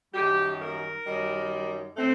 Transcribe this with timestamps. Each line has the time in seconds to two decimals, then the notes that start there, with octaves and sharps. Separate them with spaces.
0.13 F#2 D#3 G3 G4
0.60 A#4
1.05 F#2 D#3 G3
1.95 D3 A3 C4